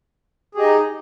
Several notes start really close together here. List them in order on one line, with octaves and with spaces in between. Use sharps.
G#4 G4 D#5 D#4